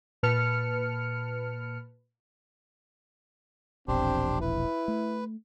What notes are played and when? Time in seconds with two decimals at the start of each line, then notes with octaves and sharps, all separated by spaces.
0.23 A#2 B4 A5 F6 C#7
3.88 E1 A#1 C4 D4 G4 C5
4.41 E4 B4
4.88 A3